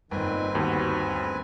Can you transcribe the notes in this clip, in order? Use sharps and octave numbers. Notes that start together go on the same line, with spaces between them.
G1 A#2 D#3 C4 B4 G#5
D#2 G#2 B3 F#4
D2